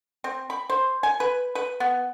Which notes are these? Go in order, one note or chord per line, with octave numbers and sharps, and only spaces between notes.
C4
B5
C5
G#5
B4
B4
B3